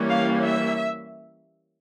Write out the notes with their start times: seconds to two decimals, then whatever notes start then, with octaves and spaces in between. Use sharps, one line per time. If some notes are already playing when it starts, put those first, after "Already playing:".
Already playing: E3 G3 A#3 C#4
0.09 F5
0.42 E5